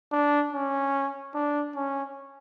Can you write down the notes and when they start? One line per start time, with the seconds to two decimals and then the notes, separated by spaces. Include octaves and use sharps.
0.12 D4
0.53 C#4
1.34 D4
1.75 C#4